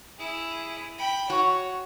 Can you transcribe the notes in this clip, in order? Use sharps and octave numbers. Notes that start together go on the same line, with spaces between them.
E4 G#4
G5 B5
F#4 C#5